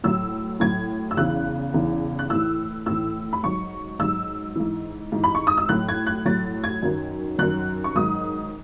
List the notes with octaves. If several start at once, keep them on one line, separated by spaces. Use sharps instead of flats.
A2 F#3 E6
A2 F#3 G#6
E6
E2 C#3 E3 F#6
E2 C#3 E3
F#6
A2 E3 E6
A2 E3 E6
B5
G#2 F#3 C#6
G#2 F#3 E6
G#2 E3
G#2 E3
B5
C#6
D#6
E6
A2 F#3 F#6
G#6
F#6
A2 F#3 A6
G#6
F#2 D#3 F#3
F#2 D#3 F#3 F#6
C#6
G#2 D#3 F#3 D#6